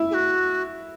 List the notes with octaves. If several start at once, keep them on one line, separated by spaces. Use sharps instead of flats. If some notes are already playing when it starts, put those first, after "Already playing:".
Already playing: E4
G#4
F#4